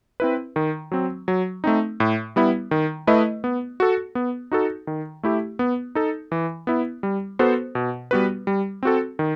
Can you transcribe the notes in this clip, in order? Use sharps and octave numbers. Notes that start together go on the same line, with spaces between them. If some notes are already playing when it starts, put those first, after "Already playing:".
C4 E4 B4
D#3
F#3 C4
F#3
A3 C4 D#4
A2
G3 B3 E4
D#3
A3 E4 B4 D#5
B3
F#4 A4
B3
D#4 F#4 A4
D#3
A3 E4 G4
B3
D#4 A4
E3
B3 E4
G3
B3 F#4 A4 C5
B2
G3 B3 F#4 B4
G3
C4 F#4 A4
D#3